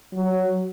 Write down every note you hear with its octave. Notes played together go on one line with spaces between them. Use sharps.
F#3